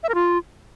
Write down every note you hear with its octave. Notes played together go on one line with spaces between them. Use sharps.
E5
A#4
F4